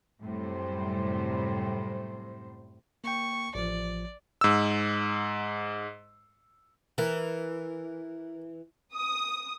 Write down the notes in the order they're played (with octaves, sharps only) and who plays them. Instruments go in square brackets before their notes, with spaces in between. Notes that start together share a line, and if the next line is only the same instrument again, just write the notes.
[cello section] F#2 A2 C3 G3 C5
[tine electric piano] A#3 G5 [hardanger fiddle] C#6
[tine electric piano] A1 F3 [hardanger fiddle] D5
[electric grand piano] G#2 E6
[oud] E3 [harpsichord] A#4
[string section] D#6